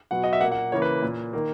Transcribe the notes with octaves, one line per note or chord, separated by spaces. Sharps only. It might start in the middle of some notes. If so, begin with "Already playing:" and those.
B2 F#3 B3 F#5
D#5
E5
A#2 A#3 F#5
F#5
C#3 E3 A#3 C#5
B4
A#2 A#3
D#3 A#3